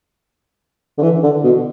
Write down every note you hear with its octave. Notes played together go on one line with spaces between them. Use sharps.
D3
E3
D3
B2